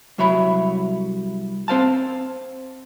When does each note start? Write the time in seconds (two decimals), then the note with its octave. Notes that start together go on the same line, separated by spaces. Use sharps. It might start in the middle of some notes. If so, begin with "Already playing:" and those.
0.18 C2 F#3 C#5 E5 B5
1.68 C4 C5 F5 A5